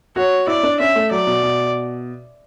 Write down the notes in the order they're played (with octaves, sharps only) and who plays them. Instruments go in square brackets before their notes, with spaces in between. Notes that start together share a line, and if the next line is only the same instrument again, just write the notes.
[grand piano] F#4 [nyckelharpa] C#5
[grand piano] E4 [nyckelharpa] D5
[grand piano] D4
[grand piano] C#4 [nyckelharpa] E5
[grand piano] A3
[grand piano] F#3 [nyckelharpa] D5
[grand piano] B2
B2